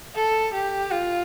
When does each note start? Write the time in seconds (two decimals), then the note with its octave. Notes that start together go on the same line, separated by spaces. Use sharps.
0.16 A4
0.53 G4
0.91 F4